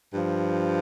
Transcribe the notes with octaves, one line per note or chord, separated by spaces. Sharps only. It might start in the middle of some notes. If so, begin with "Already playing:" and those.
G2 F3